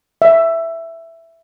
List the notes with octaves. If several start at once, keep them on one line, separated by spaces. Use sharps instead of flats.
E5